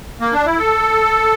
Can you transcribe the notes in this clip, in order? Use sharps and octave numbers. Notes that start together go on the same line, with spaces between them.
A#3
D4
E4
A4